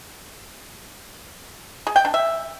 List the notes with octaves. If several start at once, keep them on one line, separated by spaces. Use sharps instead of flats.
G#4
G5
D4
E5